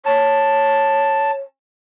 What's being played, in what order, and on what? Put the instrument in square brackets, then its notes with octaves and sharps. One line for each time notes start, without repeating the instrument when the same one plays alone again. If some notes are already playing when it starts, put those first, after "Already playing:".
[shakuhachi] C#5 [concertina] A5